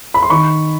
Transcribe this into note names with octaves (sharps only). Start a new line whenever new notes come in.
B5
C6
D#3 B5 C#6